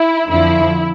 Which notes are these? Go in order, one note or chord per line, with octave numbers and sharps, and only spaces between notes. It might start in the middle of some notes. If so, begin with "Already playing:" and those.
Already playing: E4
F2 D3 F3 E4